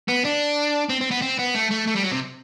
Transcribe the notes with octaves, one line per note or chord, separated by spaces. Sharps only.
B3
D4
C4
C4
B3
C4
B3
A3
A3
A3
G3
F#3
C3